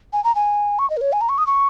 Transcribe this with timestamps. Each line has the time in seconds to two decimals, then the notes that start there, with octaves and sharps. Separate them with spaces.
0.13 G#5
0.24 A#5
0.35 G#5
0.79 C#6
0.90 D#5
0.97 A#4
1.01 C#5
1.12 G#5
1.21 A#5
1.29 C#6
1.38 D#6
1.47 C#6